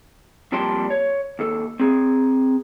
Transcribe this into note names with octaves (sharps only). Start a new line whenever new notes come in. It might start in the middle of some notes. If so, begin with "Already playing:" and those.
F2 A#2 G3 D5 A5 C6
C#5
D#2 A4
C4 G#4